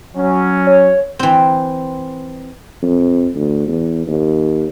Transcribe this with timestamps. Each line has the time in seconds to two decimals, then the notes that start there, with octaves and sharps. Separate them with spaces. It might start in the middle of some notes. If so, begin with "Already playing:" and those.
0.16 F#3 C#4
0.67 C#5
1.19 E3 C4
2.82 F2
3.35 D2
3.68 E2
4.07 D#2